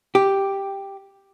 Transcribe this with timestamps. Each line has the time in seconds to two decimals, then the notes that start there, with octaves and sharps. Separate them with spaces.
0.15 G4